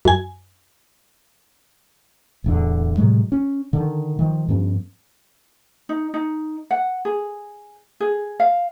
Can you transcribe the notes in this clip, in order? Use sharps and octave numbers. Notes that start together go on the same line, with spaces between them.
F#2 G#5
D1 E2 D3
A2 C3 F#3 G#3
C#4
D3 D#3
D#3 F3
G2 F3 B3 C#4
D#4
D#4
F#5
G#4
G#4
F5